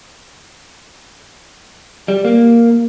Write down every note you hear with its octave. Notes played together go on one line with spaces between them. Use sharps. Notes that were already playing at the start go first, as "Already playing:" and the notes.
G3
A#3